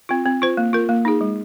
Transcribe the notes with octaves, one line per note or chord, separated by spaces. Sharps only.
C4 F4
C4
F4 C5
A#3
F4 A#4
A#3
D#4 G#4
G#3